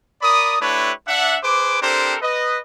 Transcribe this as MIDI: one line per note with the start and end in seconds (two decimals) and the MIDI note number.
0.22 0.58 70
0.22 0.58 74
0.22 0.58 83
0.22 0.58 87
0.61 0.92 57
0.61 0.92 62
0.61 0.92 64
0.61 0.92 67
0.61 0.92 71
0.61 0.92 73
1.08 1.37 62
1.08 1.37 76
1.08 1.37 78
1.43 1.79 68
1.43 1.79 71
1.43 1.79 72
1.43 1.79 86
1.82 2.17 60
1.82 2.17 62
1.82 2.17 67
1.82 2.17 69
1.82 2.17 70
1.82 2.17 72
2.22 2.58 71
2.22 2.58 75